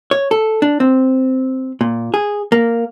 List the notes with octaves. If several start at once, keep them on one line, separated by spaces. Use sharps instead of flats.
C#5
A4
D4
C4
A#2
G#4
A#3